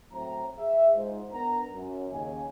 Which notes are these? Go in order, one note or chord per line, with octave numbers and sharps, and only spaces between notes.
A2 F#3 C4 C5 A#5
G#4 E5
G#2 F4 C5
B3 D4 A#4 A#5
F#2
D#2 C#3 G#5